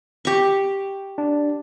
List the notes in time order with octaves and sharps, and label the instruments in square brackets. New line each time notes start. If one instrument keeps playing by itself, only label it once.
[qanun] G4 C#6
[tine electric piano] D4